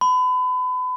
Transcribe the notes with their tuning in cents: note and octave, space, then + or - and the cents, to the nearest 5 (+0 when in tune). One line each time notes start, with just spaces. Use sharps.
B5 +35